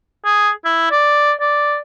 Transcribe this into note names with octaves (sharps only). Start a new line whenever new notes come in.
G#4
E4
D5
D5